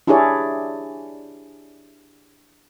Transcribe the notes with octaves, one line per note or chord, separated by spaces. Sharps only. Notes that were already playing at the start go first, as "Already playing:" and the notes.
D4 E4 G4 G#4 C#5 D5